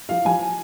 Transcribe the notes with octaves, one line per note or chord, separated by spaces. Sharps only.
F3 F5
F3 G#5